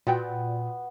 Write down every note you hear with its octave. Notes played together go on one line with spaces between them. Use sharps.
A#2 B3 F#4 G5